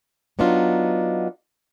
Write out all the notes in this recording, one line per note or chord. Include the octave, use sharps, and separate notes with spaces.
F#3 B3 D4 D#4 F4